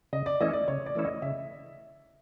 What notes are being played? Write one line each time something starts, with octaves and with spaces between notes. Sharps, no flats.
C#3 D#5
D5
E3 A3 C#4 E4 D#5
D5
C#3 C#5
D5
E3 A3 C#4 E4
D#5
C#3 E5